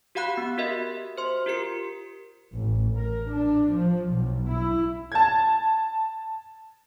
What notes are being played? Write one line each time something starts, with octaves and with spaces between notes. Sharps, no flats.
F#4 G4 F5 F#5 B5 F#6
B3
F#4 G4 A#4 D#5 E5
C5 C6
F4 G4 A#4 C#7
A1
A#4
D4
F3
B1
E4
A5 G#6